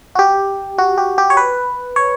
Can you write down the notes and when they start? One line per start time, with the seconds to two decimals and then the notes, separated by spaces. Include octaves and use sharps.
0.15 F#4
0.19 G4
0.78 F#4
0.98 G4
1.18 G4
1.30 C#5
1.37 B4
1.96 C#5